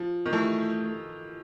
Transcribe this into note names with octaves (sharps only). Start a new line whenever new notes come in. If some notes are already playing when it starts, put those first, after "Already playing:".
Already playing: F3
D#3
E3 A3